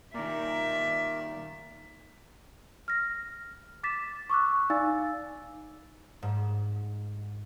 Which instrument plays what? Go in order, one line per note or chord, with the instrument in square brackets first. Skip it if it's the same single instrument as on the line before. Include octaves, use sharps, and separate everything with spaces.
[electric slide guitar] A#2 D#3 [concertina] A#4 D5 [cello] E5
[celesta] F6 A#6
D6 A6 B6 E7
C#6 D6 E6 F#6
D#4 D5 F5 G#5 E6 A6
[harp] G#2